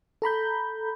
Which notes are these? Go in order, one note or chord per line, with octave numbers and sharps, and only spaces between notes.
A4 A#5 B5 G6